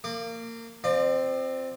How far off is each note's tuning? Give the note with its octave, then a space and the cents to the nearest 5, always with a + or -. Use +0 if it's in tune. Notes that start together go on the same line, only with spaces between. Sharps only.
A#3 -25 D6 +20
C4 +0 F4 +0 D5 +35